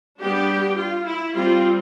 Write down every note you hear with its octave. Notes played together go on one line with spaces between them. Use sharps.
G3 B3 D4 G4
F4
E4
G3 C4 F4